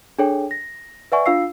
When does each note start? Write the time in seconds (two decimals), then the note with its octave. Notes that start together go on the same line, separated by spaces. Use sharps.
0.19 D4 G#4 A4 C#5 G5
0.51 A#6
1.12 B4 D5 E5 F#5 G#5 C#6
1.26 D4 F4 F5 E6 C7